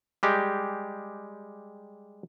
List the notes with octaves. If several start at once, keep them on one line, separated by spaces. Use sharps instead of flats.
G3 G#3 G4